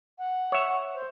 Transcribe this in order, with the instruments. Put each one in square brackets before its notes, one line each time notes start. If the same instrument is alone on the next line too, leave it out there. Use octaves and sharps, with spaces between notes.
[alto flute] F#5
[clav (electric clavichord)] C#5 E5
[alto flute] C5